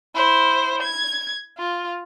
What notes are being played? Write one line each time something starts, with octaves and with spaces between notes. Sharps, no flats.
E4 C5
G#6
F4